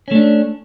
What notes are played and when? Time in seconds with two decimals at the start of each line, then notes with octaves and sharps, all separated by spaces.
0.08 C#4
0.11 A3
0.15 D4